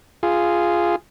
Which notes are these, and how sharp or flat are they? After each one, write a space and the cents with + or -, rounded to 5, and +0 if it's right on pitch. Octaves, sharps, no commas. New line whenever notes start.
F4 -10 G#4 +0